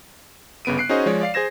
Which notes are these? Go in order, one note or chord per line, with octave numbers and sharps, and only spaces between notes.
G1 C#3 B3 D7 D#7
F#6 C7 D7
C#4 D#4 F#4 G#4 C5 D#5
F3 G#3 C#5 D5
D5 F5 C7
G#4 C5 G#6 A#6 E7